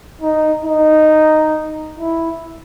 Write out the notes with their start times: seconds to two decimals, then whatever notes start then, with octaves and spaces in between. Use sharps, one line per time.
0.21 D#4
0.65 D#4
1.98 E4